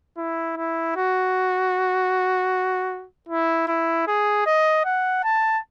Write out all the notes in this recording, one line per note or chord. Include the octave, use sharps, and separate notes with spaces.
E4
E4
F#4
E4
E4
G#4
D#5
F#5
A5